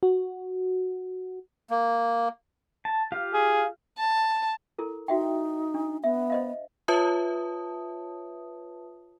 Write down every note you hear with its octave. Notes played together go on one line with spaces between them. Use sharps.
F#4
A#3
A5
F4 G4 F5
G#4
A5
E4 A4 A#4
D#4 F#4 E5 G5
D4
B3 E5
C5 D#5 F5
F4 B4 C#5 E5 A5 D#6